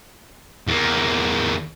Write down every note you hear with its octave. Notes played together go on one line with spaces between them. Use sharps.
E2 A#3